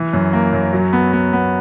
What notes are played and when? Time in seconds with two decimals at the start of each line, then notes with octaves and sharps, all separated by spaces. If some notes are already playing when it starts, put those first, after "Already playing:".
Already playing: E3
0.13 F#2
0.33 A#3
0.53 F#2
0.73 F#3
0.93 B3
1.13 B3
1.33 B3